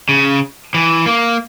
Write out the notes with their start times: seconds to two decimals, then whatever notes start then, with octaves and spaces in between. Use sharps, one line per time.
0.09 C#3
0.74 E3
1.06 A#3